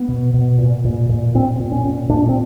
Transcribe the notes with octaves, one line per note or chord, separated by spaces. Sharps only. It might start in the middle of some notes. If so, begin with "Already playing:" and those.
Already playing: B3
B2
B2
A#2
A#2
A#2
A#2 C4
A#2
C#4
A#2
A#2 D4
C4